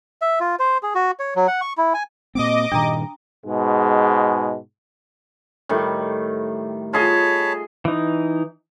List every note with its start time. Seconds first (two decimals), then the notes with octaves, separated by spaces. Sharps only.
0.22 E5
0.40 F4
0.59 C5
0.83 G#4
0.95 F#4
1.20 C#5
1.36 F#3
1.47 F#5
1.61 C#6
1.78 E4
1.94 G#5
2.35 A#2 A#3 C4 D#5 D6
2.72 G2 A#2 D#3 D4 A#5
3.45 G#2 B2 G#3
5.69 A2 D#3 G3
6.93 F4 G#4 C#5 D#5 A5 B5
7.85 E3 D#4